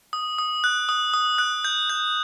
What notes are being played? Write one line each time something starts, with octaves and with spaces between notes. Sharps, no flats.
D#6
D#6
F#6
D#6
D#6
F#6
G6
G6